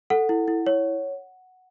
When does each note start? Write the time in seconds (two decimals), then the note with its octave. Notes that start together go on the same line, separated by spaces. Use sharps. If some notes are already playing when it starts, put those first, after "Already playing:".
0.10 A4 F#5
0.29 E4
0.48 E4
0.67 C#5